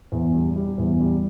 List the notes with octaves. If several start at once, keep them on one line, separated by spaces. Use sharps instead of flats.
E2
G3
G3
E2
G3